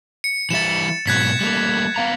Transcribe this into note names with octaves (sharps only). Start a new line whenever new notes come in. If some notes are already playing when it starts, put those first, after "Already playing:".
C#7
E3 G3 E5 A6 E7
G#2 B2 F#3 F#6 G#6 B6
G3 A3 A#3
B3 F5 A#5